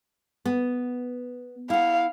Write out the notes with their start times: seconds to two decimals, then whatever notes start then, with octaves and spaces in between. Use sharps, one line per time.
0.45 B3
1.70 E4 F5 F#5